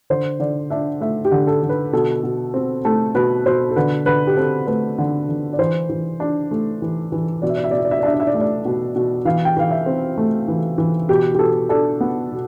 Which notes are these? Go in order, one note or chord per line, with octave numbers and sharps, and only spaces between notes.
D3 C5
D3 D5
D4 E5
A3 E5
G4
D3
A4
D3
B4
B2 A4
B2
C4
A3 A4
B2 B4
B2 C5
A4
D3 B4
D3 B4
G4
C4 A4
A3 B4
D3
D3
D5
E3 C5
E3
D4
A3
E3
E3
B2 D5
E5
D5
E5
B2 D5
E5
D5
E5
D5
D4 E5
D5
E5
D5
A3 E5
D5
B2
B2
E3 F5
G5
E3 F5
E5
C4
A3
E3
E3
B2 G4
G4
B2 A4
D4 A4
B3
B2